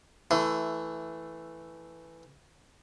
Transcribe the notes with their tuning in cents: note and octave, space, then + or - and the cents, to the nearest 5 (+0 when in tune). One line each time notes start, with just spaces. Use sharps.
E3 +0 A3 +5 C6 -40